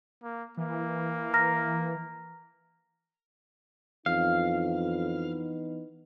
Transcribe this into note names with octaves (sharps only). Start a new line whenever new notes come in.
A#3
E3 A#3
A#5 F6 A#6
F2 E3 B3 D#4 F5